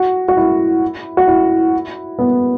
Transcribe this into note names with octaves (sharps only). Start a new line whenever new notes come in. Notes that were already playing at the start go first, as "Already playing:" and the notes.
Already playing: F#4
F#4
E4
F#4
E4
B3